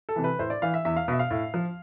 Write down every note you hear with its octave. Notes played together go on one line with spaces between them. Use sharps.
A4
C3 E3
B4
A2 C5
D5
E3 F5
E5
E2 E5
F5
B2 E5
F5
A2
F3